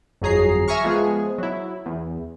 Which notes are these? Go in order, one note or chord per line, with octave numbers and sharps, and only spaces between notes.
G1 F2 F#3 G#4 A#5 C7
E5 G#5 A#5 C#6 F6
F3 G#3 B3 G#4
F#3 E4
E2